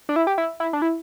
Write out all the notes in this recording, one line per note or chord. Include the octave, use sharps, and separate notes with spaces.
D4
E4
G4
E4
E4
D4
E4